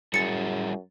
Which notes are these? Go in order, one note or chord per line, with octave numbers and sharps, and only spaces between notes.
F#2 G3 E4 G#4 A6 C#7